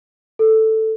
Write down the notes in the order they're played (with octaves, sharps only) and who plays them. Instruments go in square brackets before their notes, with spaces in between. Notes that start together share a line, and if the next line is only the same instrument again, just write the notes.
[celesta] A4